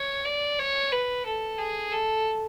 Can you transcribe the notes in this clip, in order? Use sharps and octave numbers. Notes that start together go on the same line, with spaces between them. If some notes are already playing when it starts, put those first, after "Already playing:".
Already playing: C#5
D5
C#5
B4
A4
G#4
A4